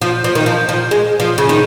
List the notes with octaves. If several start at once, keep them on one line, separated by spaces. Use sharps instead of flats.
F3
F3
D#3
F3
F3
G#3
F3
C#3
D#3